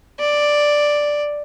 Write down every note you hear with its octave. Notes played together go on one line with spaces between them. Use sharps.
D5